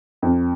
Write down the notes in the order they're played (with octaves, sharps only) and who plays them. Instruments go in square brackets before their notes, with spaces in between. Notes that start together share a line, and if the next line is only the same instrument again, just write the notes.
[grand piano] F2